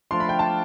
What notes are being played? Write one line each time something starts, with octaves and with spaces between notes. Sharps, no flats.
F3 A3 D4 F4 C6
B5
G5
A5